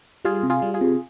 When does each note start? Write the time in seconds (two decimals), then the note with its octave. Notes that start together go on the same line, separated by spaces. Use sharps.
0.25 G3 F4 G#4
0.43 C3
0.50 F4 G#4
0.62 G3
0.74 F4 G#4
0.81 C3